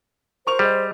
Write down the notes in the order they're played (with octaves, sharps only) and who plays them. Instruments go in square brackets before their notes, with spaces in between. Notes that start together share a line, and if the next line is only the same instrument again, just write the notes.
[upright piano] A#4 C#6 F7 [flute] C5
[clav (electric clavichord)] G3 [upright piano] G#4 D#5